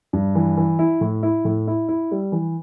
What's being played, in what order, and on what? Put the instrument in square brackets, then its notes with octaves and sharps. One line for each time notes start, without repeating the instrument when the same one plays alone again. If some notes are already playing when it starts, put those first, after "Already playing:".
[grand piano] G2
E3
E3
E4
A2
E4
A2
E4
E4
G3
E3